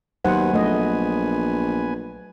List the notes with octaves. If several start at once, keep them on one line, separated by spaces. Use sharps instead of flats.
D#2 F#3 B3 B4 C5 F#5 G#5
A#1 A3 D#5